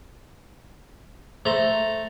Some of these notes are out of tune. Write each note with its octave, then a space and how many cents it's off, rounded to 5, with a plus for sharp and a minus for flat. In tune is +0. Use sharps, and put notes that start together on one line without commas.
A3 +0 C5 +0 A#5 +0